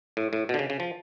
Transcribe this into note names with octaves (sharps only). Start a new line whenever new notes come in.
A2
A2
B2
D3
C#3
C#3
F3